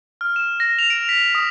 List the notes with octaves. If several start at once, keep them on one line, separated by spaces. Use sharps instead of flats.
F6
E7
A#6
F7
D7
B6
D#6